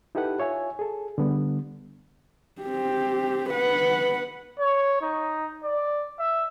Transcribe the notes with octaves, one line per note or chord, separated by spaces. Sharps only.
D#4 E4 G4 A4 B4 F#5
F4 C#5 E5 G#5
G#4 A4
D3 G3 B3
C4 G4
B4 F#5
C#5
D#4
D5
E5